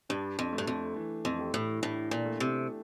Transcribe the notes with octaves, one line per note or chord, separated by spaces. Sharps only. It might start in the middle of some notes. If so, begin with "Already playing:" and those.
G2 D4
F2
A3
G2
F2
E3
F2
G4
A2
A2 D4
A#2
A3
C3